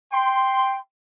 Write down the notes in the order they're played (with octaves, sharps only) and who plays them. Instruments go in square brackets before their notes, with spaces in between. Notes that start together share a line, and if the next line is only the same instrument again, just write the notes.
[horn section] G5 C6